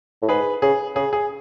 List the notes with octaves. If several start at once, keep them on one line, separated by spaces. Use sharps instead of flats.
A2
G#2 G#4 B4
C#3 G#4
C#3 G#4
G#4